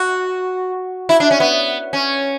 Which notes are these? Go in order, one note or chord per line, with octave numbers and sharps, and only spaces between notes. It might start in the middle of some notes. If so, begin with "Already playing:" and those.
Already playing: F#4
E4
D4
C#4
B3
C#4